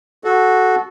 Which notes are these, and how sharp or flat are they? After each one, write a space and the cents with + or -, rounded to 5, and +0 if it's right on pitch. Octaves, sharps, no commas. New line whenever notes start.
F#4 +0 A4 -20